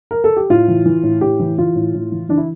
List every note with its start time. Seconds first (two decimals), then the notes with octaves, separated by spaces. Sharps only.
0.11 A#4
0.24 A4
0.37 G4
0.50 A2 F4
0.68 E3
0.86 E3
1.03 A2
1.21 A2 G4
1.40 E3
1.58 E3 F4
1.76 A2
1.94 A2
2.12 E3
2.29 E3 D4
2.38 E4